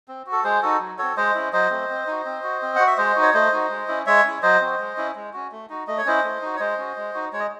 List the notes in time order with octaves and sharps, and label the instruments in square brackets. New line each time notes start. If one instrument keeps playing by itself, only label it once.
[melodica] C4
F#4
A4
G#3 G#4 C5
D#4 F#4 A4
F#3
C4 F#4 A4 C#5
G#3 C5 D#5
C#4 E4
F#3 C5 D#5
A3 C4
C4
D#4 F#4
C4
F#4
C4
F#4 F#5
E5
G#3 C5 D#5
D#4 F#4
C#5
A3 C5 D#5
D#4 F#4
G#3
C#4 E4
G#3 C#5 E5
C#4 E4
F#3 C5 D#5
C4 F#4
G#3
C#4 E4
G#3
C#4 F#4
A3
D#4 F#4
A3 D#5
C#5
C#4 E4 C5 D#5
A3
D#4 F#4
C#5
G#3 C5 D#5
C#4 F#4
G#3
D#4 F#4
G#3 C#5
D#5